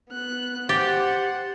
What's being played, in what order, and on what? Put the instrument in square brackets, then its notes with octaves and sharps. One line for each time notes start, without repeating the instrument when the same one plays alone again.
[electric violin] B3 F#6
[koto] G4 [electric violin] C5 F#5 [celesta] A6